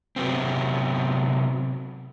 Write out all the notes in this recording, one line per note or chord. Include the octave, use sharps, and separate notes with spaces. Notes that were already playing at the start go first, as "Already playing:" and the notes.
C3 F#3 B3 C4